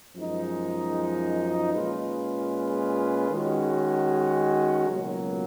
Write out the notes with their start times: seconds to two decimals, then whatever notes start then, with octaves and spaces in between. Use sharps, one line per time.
0.16 F#2 F3 G#3 D#4
1.74 A#2 G#3 C#4 F4 B4
3.31 D#3 G#3 C#4 F#4
4.88 C#2 B2 F#3 A#3